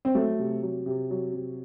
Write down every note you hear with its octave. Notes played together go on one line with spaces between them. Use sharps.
C4
F#3 A3
C3
F#3
C3
F#3
C3